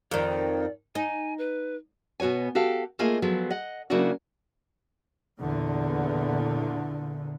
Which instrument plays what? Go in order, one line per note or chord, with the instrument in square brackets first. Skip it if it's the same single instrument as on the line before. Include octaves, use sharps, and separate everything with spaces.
[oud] F2 D#3 [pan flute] D5
[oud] D#4 [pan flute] G#5
[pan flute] B4
[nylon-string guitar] B2 B3 F#4 C#5 G#5
F#4 G4 A4 F5
A3 A#3 F4 G#4 D#5 G#5
F3 F#3 G#3 B3 G#4 A4
D#5 F#5
C#3 F#3 A#3 D4 E4 F#4
[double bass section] E2 A#2 D3